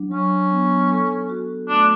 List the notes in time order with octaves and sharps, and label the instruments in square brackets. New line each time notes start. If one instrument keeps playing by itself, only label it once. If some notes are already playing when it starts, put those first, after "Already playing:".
Already playing: [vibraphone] F#3 D4
[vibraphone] F#3 [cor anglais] C#4
[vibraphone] B3
A4
F#4
[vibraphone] A3 [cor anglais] D4